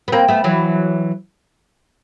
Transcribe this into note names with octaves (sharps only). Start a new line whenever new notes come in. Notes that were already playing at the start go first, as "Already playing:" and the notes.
B3
A#3 C4
A3 B3
E3 F#3